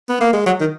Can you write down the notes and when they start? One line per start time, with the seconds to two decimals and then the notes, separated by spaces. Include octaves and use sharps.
0.09 B3
0.21 A#3
0.33 G#3
0.46 F#3
0.60 D#3